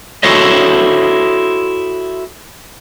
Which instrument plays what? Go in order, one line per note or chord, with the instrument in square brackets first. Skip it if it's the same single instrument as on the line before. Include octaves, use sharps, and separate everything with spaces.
[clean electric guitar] E4 F#4 A4 C5 C#5 D#5